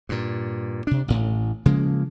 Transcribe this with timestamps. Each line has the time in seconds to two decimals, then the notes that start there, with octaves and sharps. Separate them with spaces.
0.09 G2 A#2
0.87 C3 D4
1.08 A1 A2
1.66 C#3 F3 G#3 A#3